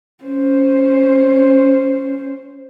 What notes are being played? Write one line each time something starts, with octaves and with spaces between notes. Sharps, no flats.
C#4 C5